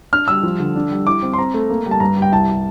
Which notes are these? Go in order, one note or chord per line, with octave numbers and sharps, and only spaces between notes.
D4 F6
G3 E6
F3
D3
D4
G3
E4 D6
C4
C6
C4 A#5
A3
A#3
G3
A5
G2 A#5
G3
G5
C2 A5
G3